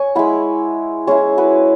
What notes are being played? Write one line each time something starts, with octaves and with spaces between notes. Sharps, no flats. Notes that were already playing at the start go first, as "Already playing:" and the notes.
Already playing: C#5 G#5 C#6
G#3 E4 F#5 B5
G#3 C#4 E4 G#4 C#5
F#4 B4